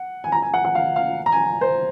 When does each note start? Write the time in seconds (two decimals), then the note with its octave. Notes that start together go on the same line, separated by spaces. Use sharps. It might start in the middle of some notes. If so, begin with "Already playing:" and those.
Already playing: F#5
0.24 G#5
0.32 A#5
0.42 G#5
0.54 F#5
0.65 F#5
0.75 F5
0.96 F5
1.26 A#5
1.32 G#5
1.61 C5